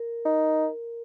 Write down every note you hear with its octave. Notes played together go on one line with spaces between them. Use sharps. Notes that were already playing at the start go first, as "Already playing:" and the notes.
Already playing: A#4
D#4